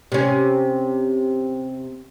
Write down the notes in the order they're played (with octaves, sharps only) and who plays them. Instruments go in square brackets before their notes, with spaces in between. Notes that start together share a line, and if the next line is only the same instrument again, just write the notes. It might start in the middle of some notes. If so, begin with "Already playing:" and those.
[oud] C3 C#4